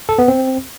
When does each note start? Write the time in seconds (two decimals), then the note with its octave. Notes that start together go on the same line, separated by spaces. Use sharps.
0.09 A4
0.18 B3
0.28 C4